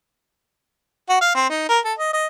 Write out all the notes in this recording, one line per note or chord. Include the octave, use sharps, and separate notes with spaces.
F#4
F5
C4
D#4
A#4
A4
D#5
D#5